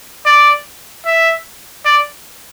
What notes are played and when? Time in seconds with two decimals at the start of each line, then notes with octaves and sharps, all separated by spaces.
0.26 D5
1.06 E5
1.85 D5